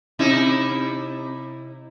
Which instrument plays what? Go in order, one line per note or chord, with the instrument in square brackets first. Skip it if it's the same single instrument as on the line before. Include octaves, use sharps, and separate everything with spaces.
[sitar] C3 D#4 E4